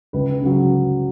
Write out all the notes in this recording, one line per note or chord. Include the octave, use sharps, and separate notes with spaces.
C#2 B4
C#3 F#3